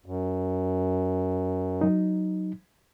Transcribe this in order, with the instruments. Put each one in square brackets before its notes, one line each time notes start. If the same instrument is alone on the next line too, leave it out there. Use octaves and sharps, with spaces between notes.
[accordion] F#2
[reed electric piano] F#3 D#4